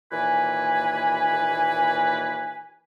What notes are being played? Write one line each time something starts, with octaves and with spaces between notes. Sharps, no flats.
D#2 A#2 E3 B4 G#5